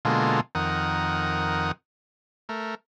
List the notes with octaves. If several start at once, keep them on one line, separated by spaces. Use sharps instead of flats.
B2 D3 G#3 A#3 F4 A4
F2 D#3 A#4 F#5 D#6
A3 A#4